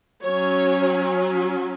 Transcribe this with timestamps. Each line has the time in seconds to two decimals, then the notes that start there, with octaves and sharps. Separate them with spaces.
0.23 F#3 C#4 C#5